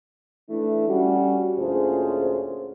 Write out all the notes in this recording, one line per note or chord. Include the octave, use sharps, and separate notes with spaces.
E3 A3 D4 E4
G3 C#4 F#4
D2 A#2 C#4 F4 G#4 C5